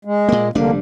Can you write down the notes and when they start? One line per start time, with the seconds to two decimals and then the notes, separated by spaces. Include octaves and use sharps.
0.05 G#3
0.29 A#2 A#3
0.55 F1 D3 G3 A#3 D4